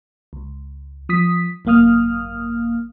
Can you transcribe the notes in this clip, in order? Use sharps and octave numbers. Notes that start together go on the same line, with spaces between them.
C#2
F3 D#6 B6
G#1 F#2 A#3 F5 D#6 F6